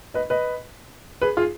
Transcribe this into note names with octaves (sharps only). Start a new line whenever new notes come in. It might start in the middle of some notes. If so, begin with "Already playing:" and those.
B4 D#5
B4 D#5
G#4 B4
F4 G#4